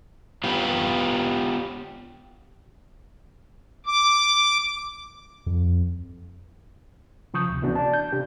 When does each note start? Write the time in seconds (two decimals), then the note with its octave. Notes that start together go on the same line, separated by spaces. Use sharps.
0.44 B3 F4 G4
3.86 D6
5.46 F2
7.34 C#3 F3 C#6 D#6 G6
7.49 D2 C3
7.63 C3 E3 B3 C#4 D4 F#4
7.75 D5 A5
7.94 G6
8.12 C3 D4 G4